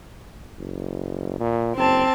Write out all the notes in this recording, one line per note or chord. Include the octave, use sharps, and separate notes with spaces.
F#1
A#2
F#1 C4 A5